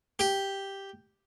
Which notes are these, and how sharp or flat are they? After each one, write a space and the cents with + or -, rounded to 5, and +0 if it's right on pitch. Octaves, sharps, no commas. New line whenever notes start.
G4 +0